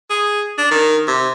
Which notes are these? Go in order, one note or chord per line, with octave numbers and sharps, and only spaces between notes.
G#4
D4
D#3
C3